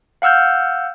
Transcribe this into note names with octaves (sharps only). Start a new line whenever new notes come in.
F5 F#5 E6 F6 G6